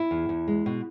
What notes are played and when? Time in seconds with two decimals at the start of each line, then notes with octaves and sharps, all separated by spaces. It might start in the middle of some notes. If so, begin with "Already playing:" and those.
Already playing: E4
0.11 E2
0.29 E2
0.48 G#3
0.66 B2